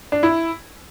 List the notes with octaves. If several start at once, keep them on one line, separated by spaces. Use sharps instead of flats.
D4
E4